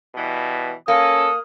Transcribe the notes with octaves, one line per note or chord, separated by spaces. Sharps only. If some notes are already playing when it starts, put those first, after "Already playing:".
B2 E3 G3
A#3 C#4 A4 D#6